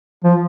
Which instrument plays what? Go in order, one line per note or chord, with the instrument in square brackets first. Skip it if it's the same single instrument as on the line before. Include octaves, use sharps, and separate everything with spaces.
[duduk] F3